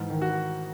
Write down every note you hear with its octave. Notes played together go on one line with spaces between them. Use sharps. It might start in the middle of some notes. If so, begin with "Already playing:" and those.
Already playing: G#2 E3
D#3
F#4